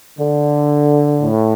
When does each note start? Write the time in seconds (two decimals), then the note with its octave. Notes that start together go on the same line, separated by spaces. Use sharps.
0.18 D3
1.22 A2